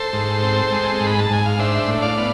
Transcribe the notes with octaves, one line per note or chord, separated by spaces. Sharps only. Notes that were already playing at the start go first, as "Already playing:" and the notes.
Already playing: A4 C5
G#2
C4
G#3
G#2
B5
A5
G#2 G#5
F5
D4 C5 E5
A2
D5 F5
B3